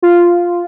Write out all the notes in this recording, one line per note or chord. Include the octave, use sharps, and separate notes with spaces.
F4